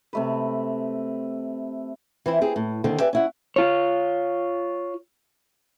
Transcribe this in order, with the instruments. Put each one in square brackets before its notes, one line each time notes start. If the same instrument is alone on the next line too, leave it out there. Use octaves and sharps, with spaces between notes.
[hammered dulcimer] C3 A3 B4
[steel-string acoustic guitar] E3 C4 E4
C4 G4 G#4
A2
D#2 D3 D#3 C4
G4 B4 D5 E5 G5 G#5
C#4 E4 F#5
[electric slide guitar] F4 C#5